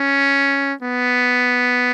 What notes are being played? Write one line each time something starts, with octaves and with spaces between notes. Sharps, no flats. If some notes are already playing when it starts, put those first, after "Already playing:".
Already playing: C#4
B3